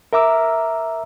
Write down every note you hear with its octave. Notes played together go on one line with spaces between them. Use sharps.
A#4 E5 A#5 D6 E6